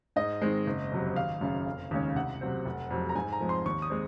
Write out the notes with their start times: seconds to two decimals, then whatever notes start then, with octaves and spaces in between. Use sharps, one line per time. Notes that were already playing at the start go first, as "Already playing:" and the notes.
0.16 G#2 D#5
0.41 D#3 G#3 C4
0.67 F#1
0.91 F2 C3 F#3
1.16 G#1 F5
1.41 F#2 C#3
1.67 F1
1.91 D#2 C#3 G#3 C#4
2.15 C2 F#5
2.41 C3 F#3 C4
2.66 F1
2.90 F2 C3 F#3
3.09 A#5
3.15 G#2 G#5
3.33 A#5
3.41 F3 G#3 C4
3.49 C6
3.65 D#2 C#6
3.82 D#6
3.90 G#3 C4